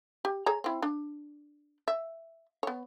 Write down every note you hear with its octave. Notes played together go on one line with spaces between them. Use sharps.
G4
G#4 C#5 A#5
C4 E4
D4
E5
B3 C#5